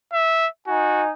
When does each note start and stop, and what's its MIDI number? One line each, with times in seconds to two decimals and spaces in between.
0.13 0.47 76
0.67 1.12 63
0.67 1.04 66
0.67 1.12 80